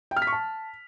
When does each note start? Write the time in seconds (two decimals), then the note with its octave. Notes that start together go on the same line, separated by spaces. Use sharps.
0.11 G5
0.16 F6
0.22 B6
0.27 C#6
0.33 A5